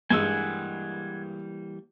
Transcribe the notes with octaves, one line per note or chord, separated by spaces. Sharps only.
G2 E3 G3 G#3 A#3 F#5 G#5 E6